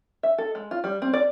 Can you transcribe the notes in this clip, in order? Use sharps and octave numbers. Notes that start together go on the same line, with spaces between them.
E5
A4
G#3
F4
G3
C4
D5